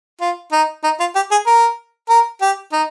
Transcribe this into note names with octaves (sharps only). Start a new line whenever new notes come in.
F4
D#4
D#4
F4
G4
G#4
A#4
A#4
G4
D#4